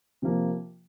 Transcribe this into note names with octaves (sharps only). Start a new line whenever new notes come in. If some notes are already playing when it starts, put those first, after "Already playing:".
C3 F3 A#3